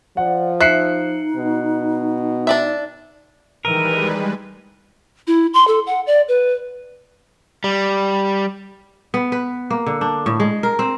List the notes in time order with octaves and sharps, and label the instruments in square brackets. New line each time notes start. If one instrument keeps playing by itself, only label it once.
[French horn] F3 [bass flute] D5 [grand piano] F#5
[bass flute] D#4 [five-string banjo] E5 [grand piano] F#6 C7 C#7
[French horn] B2
[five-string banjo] D4 D5 E5
[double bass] D#3 E3 [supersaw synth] G3 G#3 B4 [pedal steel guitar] A#4 [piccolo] D#7
[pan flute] E4
C6
A4
F#5
D5
B4
[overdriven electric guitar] G3
[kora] B3
B4
A#3
D3
D4
A2
G#3
A#4
C4